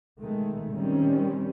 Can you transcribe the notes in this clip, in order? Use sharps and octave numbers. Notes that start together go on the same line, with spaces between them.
B2 D#3 G#3 A3
D#3 G3 C4 C#4